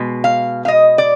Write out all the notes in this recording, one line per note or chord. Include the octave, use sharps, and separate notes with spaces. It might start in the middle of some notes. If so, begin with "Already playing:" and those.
Already playing: B2 G#3
F5
F5
D#5
D5